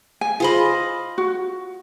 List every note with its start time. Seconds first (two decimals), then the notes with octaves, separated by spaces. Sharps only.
0.21 G#5
0.40 F4 G#4 C5 D#5 B5
1.18 F#4